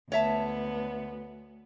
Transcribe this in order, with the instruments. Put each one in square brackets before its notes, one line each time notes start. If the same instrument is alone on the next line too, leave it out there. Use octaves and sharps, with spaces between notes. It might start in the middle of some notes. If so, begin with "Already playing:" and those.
[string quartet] D2 B3 [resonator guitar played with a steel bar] C#5 E5 A5